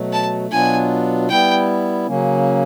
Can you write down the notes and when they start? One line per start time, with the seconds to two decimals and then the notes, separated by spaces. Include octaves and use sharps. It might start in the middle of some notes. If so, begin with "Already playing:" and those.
Already playing: B2 F#3 A3
0.13 A5
0.51 B2 F#3 B3 D4 F4 G#5
1.29 G3 B3 E4 G5
2.07 C#3 F#3 A#3 C#4